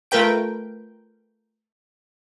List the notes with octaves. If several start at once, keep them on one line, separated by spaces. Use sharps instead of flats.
A3 F4 A#4 B4 G5 D7